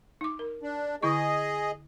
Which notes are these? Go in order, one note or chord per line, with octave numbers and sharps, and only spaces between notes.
D#4 D6
A#4
D4
D3 E4 G#4 D#5 C#6